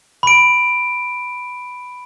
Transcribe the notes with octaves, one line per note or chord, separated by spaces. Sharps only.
B5 D7